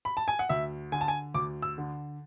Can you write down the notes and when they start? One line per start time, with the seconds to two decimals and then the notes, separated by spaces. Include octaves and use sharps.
0.05 B5
0.17 A5
0.28 G#5
0.39 F#5
0.49 D2 E5
0.92 D3 G#5
1.01 A5
1.08 G#5
1.35 D2 D6
1.62 E6
1.78 D3